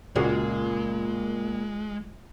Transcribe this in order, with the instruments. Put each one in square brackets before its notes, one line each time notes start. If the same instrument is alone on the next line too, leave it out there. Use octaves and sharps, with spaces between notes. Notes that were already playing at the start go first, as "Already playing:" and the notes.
[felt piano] C#2 [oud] A#2 [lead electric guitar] G#3 [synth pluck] F#4 G#4 D5